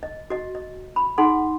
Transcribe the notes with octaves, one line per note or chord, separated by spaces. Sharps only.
D#5
F#4 D#5
D#5
B5
D#4 G#4 F#5 C6